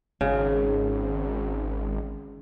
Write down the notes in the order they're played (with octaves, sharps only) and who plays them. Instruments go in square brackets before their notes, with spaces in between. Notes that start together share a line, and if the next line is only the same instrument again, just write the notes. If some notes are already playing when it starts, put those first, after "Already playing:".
[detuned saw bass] G#1 [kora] C#3